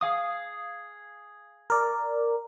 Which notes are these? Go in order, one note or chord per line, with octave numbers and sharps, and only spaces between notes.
G#4 F5 D#6
A#4 D5